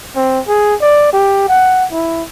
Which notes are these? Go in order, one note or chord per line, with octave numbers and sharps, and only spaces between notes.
C4
G#4
D5
G4
F#5
E4